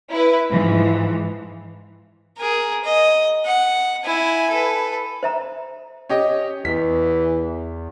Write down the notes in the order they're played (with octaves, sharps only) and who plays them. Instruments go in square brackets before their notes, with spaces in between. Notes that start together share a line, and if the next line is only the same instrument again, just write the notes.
[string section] E4 B4
G#2 E3 F3
[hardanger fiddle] G#4 A#4
D#5
F#5
E4 G#5
A4 B4
[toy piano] C5 E5 A#5
[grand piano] C#4 G4 D#5
[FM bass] E2 [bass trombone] E3 [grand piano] B6